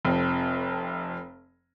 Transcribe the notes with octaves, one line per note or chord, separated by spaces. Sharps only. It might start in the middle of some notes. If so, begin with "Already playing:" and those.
F1 F2